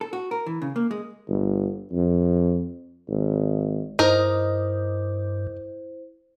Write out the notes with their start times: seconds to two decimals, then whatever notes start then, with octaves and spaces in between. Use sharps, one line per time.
0.01 A4
0.13 F#4
0.31 A#4
0.46 E3
0.62 C#3
0.76 A#3
0.91 G#3
1.29 G1
1.93 F2
3.09 G#1
3.99 G2 D#4 E4 A#4 C5 D#5